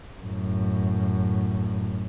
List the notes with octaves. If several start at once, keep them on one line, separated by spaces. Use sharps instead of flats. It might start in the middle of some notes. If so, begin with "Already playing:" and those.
F#2 A2